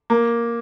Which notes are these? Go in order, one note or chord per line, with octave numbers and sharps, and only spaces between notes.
A#3